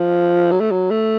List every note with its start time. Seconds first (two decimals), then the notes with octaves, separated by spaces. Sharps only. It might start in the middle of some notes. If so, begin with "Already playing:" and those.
Already playing: F3
0.51 F#3
0.61 A3
0.71 F#3
0.91 A3